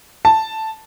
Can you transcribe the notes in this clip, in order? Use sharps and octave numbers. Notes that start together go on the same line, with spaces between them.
A5